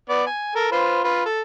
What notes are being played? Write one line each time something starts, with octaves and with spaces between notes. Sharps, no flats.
B3 D5
G#5
A4 A#4
F4 B4 C5
F4 B4
A4